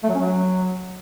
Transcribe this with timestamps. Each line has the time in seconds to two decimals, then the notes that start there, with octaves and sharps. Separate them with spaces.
0.04 A3
0.09 F#3
0.15 C#4
0.20 F#3